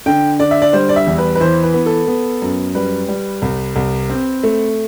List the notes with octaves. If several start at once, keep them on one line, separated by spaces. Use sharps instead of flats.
D3 G5
D3 D5
E5
D5
G3 C5
D5
E5
E2
B4
B4
E3 C5
B4
B3
A4
B3
F#2
G3 B4
G3
C2
C2
C4
A3